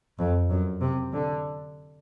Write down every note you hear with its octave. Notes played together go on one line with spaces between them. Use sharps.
F2
F#2
C3
D3